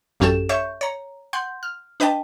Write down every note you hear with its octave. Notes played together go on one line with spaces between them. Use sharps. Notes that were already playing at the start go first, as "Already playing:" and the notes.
A1 F#2 C#4 G4 A4 E7
C#5 E5 C#6 G6
C#5 A#5
F#5 C6 G6
F6
D4 B4 D#5 G5 A5